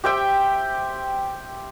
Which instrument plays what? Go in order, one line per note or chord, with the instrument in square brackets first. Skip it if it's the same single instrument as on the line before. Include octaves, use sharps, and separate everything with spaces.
[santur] G4 C5 E5 G5